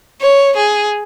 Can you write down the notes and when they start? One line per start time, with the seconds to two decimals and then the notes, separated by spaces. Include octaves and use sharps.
0.21 C#5
0.56 G#4